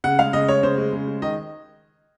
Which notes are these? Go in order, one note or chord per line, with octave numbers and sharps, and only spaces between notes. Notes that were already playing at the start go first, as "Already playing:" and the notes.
C#3 F#5
G#3 F5
C#3 D#5
G#3 C#5
C#3 C5
G#3
C#3
G#3
D#3 D#5